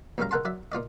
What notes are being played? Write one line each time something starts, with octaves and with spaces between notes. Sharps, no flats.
D2 A#2 C#3 G3 F5 A#5
C#2 G#3 A#4 F#5 A5 C6
F#3 D5 E5
A#2 F4 D5 D#5